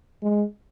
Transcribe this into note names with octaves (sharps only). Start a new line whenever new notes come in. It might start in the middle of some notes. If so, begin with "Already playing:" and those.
G#3